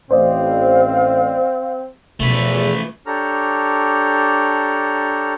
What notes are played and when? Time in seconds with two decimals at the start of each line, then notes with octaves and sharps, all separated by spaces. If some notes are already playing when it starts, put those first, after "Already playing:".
0.11 A1 A2 C4 C5 D5 D#5 F5
2.20 E2 B2 E3 F3 A3 B3 B4
3.06 D4 G4 A4 C#5 A#5 F6